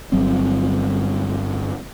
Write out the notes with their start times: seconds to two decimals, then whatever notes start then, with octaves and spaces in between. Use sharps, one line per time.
0.12 G1 F#3 G3 C4